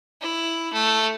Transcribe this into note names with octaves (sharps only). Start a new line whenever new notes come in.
E4
A3